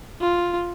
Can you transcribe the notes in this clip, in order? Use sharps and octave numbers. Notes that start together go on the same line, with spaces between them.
F4